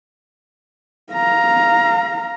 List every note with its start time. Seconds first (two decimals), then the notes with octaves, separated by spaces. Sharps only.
1.13 F5 A#5